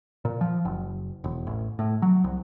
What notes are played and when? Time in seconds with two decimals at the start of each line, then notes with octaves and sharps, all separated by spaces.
0.25 A#2
0.41 F3
0.65 F#1
1.24 E1
1.47 A1
1.79 A2
2.02 F#3
2.24 C2